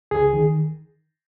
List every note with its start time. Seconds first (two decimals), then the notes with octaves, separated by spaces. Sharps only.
0.11 C#2 G#4
0.33 D#3